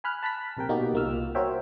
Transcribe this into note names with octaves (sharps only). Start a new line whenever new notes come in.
G#5 B5 F6 F#6
A5 B5 F#6 B6
A#1 C3 A#4 G5
B2 A#3 D#4 F#4 G4
C2 A#3 F4 E6 F6
F#4 A#4 C5 C#5 E5 G5